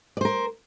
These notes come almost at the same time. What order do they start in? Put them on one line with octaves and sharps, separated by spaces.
D5 C5 A#4